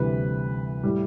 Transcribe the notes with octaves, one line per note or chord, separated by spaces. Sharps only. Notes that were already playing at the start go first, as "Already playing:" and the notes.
Already playing: D2 C3 E3 G3 B4
A2 G3